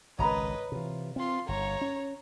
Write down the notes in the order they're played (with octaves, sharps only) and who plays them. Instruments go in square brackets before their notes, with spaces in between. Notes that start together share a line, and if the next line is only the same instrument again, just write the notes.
[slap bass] G#1 C#2 D#3 [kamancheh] B4 D#5 [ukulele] C#5 A#5 B5
[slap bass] C3 E3 [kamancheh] F4
[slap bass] C4 [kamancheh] F4 C6
[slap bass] G1 [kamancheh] C#5 A#5
[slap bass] C#4